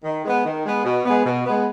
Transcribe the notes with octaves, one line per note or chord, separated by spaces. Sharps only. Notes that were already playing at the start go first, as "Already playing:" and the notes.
D#3
G#3 B3
D#3
G#3 B3
B2
G#3 B3
B2
G#3 B3